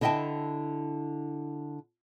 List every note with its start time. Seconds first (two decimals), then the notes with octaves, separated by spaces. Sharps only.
0.01 D3 E4 D#5 E5 G5 A5